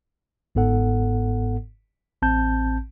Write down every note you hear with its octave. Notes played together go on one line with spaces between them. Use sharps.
G1 G#2 B3 A4 F#5
A1 C4 A5 G6